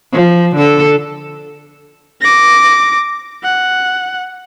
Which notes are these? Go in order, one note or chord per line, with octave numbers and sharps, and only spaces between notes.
F3
D3 A4
D6 A#6
F#5